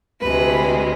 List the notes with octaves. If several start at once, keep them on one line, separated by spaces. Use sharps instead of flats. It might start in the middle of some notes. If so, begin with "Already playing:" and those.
D2 C3 G#3 B4